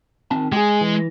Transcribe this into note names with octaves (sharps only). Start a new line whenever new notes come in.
D#3 C4 A5
G#3 G4 G#4
E3